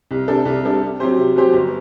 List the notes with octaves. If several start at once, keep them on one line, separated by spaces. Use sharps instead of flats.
C2
C3 G3 D4 A4
C2
C3 G3 D4 A4
C3
F#3 C4 G4 C5
C3
F#3 C4 G4 C5
G1